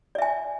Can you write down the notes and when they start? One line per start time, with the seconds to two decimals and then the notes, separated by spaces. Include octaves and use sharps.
0.15 D5
0.18 E5
0.22 G#5